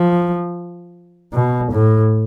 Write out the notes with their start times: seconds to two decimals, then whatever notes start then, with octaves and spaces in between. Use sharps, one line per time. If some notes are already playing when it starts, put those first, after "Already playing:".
Already playing: F3
1.33 B2
1.72 A2